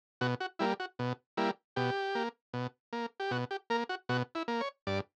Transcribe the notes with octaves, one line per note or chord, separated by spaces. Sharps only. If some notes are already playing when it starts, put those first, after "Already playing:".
B2 F#4
F#4
G3 A#3 E4
F#4
B2
G3 A#3 E4
B2 G4
A#3
B2
A#3
G4
B2 F#4
G4
A#3 A#4
F#4
B2 F#4
E4
A#3
C#5
G2 D5